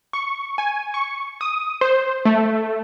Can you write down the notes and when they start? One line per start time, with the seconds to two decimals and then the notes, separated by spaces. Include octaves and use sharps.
0.13 C#6
0.58 G#5
0.94 C#6
1.41 D#6
1.81 C5
2.25 A3